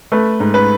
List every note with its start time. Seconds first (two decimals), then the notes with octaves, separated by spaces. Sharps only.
0.12 A3 B4
0.40 G#2
0.54 B4